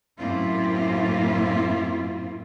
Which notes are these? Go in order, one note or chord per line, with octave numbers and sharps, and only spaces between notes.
F#2 A2 A#3 C4 E4 F4